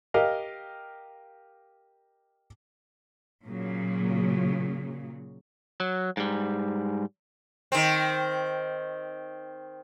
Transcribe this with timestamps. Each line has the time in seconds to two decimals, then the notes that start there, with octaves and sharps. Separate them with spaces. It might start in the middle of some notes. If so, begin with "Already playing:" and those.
0.14 G4 A#4 D#5 F5
3.46 A#2 C#3 F#3
5.80 F#3
6.17 G#2 G3
7.72 D#3 C4